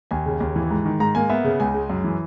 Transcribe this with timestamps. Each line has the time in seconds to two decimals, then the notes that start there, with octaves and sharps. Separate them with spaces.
0.11 D#2 G#5
0.26 C#3
0.41 D#2
0.56 E3
0.71 G#2
0.85 D#3
1.00 G#2 A#5
1.15 A#3 G#5
1.30 B3 E5
1.44 C#3
1.60 C#2 G#5
1.74 G#3
1.90 F#2
2.04 E3